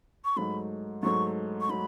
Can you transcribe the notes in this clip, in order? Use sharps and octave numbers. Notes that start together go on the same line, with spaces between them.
C#6
G#2 F#3 A3 B5
G#2 F#3 A3 C#6
C#6
F#3 A3 B5